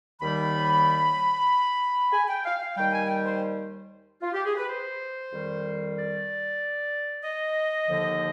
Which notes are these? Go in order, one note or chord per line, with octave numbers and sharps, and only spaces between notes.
D#2 D#3 G3 B5
G#5
G5
F5
F5
D#2 D#3 G3 G5
G#5
G5
C5
F4
G4
G#4
B4
C5
F2 D#3 G3
D5
D#5
D#2 D3 F3